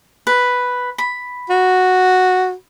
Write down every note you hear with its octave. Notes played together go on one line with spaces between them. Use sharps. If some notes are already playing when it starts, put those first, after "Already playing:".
B4
B5
F#4